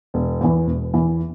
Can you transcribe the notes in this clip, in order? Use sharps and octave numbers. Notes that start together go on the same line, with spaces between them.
E1
E2 E3
E1
E2 E3